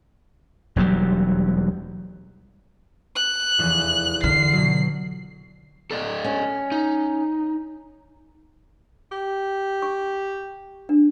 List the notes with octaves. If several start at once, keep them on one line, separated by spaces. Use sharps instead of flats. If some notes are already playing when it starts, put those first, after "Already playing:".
E1 D#2 F#3 G3
F#6
F1 E2
D3 F6 C7
B2 F#3
A4 D5 D#5
C#4
D#4
G4
C#6
D4